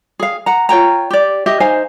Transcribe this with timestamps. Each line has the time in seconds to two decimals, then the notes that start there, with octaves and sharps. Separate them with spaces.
0.19 G#4 F5
0.46 F#5 A#5
0.69 F4 C#5 G5 A#5
1.10 G4 D5
1.46 G4 D#5 E5
1.60 D#4 C5 F5 G#5